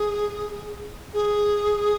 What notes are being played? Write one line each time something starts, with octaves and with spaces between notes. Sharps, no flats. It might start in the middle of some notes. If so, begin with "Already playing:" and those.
Already playing: G#4
G#4